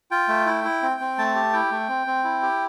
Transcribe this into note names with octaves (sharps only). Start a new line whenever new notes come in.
F4 G5
A3
E4
E4
C4
C4
A3 A5
G4
E4 G5
A3
C4
C4
E4
G4